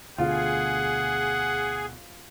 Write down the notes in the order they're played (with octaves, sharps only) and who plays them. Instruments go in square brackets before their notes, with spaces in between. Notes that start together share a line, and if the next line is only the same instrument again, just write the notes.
[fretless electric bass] D2 B2 D3 [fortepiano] F4 [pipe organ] G#4 [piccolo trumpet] F#5